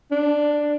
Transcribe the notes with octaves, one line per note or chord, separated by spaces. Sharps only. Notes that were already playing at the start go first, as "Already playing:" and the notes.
D4